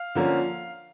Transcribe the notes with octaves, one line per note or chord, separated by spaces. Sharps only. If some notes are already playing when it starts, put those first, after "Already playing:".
Already playing: F5
D3 F3 A#3 C#4